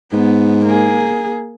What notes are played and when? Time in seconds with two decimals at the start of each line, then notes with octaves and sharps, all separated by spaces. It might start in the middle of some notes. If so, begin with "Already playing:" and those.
0.13 G#2 B3
0.66 A#3 G#4